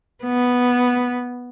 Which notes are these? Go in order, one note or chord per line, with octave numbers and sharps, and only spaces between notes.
B3